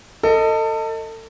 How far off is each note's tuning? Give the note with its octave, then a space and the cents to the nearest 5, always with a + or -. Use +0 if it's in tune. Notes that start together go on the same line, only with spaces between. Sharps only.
A4 +30 D#5 +0